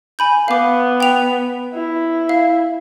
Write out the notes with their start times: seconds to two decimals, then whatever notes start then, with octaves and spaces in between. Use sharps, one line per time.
0.19 G#5 B5 G6
0.48 B3 F5 D6
1.00 G5 F7
1.74 E4
2.29 F5